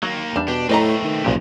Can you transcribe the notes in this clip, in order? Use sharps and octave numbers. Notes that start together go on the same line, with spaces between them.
F#3 A#3 D#4
E2 G3 D4
B2 D4 G4
A2 A3 C4 B4 D#5 A#5
D#3
F#1 B1 A#2 F3 G#3 G4